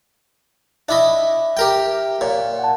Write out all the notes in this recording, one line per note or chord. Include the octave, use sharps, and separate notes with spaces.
D4 E4 D#5 E5
G4 A#4 G5
A#2 C#5 F5
F#5 A5